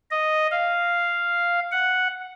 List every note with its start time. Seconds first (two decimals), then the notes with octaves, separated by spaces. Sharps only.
0.11 D#5
0.51 F5
1.72 F#5